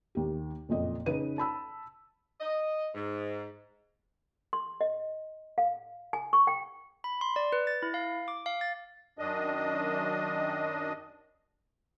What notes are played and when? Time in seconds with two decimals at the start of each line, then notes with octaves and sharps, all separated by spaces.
0.15 D#2 G4
0.69 F#1 F2 A#2 D#5
1.06 C#3 D#4 B4 D#7
1.38 A5 B5 E6
2.40 D#5
2.95 G#2
4.53 C6
4.81 D#5
5.58 F5
6.13 G#5
6.33 C#6
6.47 G5
7.04 B5
7.21 C6
7.36 D5
7.52 B4
7.67 A6
7.82 E4
7.94 F5
8.28 D6
8.46 F5
8.61 A6
9.19 F#2 D#3 D4 D#5